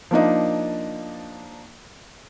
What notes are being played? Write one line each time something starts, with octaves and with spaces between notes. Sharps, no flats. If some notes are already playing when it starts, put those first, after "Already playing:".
F3 A#3 D4 D#4